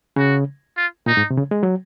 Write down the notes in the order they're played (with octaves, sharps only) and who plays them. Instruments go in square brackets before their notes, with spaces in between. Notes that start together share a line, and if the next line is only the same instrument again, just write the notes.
[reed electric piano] C#3 [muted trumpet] F#4
[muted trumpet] F4
[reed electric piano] A#2 [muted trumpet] D#4
[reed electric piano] G#2
C3
C#3
G#3
F#3